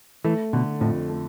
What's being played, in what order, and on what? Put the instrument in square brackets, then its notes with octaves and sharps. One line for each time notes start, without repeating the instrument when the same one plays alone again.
[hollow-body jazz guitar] E3 [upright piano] A3
[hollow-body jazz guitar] B2 [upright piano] D3
[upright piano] F2 [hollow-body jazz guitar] A2
[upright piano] A3